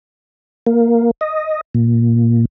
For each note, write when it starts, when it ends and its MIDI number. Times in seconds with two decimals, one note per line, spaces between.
0.67 1.11 58
1.21 1.61 75
1.74 2.45 46